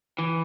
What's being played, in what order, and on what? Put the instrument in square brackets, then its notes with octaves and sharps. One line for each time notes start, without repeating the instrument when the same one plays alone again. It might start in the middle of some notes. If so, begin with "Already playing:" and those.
[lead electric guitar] E3